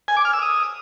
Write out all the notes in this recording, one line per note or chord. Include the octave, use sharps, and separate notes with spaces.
G#5
D6
F6
E6
D#6